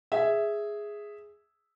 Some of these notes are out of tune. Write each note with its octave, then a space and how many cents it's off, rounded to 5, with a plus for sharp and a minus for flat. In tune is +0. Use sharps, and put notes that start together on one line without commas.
G#4 +0 E5 +0